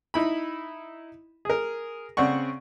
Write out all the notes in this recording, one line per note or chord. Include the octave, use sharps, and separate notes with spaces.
D#4 E4 B5
G#4 A#4
C#3 C4 D5 F#5 C#6